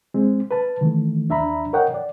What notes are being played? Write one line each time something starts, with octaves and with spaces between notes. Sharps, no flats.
G#3 C4
B4 A5
D#3 E3 A3
D#2 D4 E5 A#5 B5
A#4 C#5 D#5 F#5 G5
D5